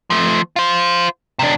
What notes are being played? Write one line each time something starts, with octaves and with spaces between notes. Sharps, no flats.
F3 A3
F4 C5
C3 D4